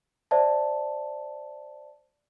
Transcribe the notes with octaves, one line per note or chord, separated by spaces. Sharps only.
C5 D5 E5 A5